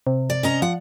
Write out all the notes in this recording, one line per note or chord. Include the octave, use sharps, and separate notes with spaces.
C3
D5
C#4 D#5 A#5
F3 F#5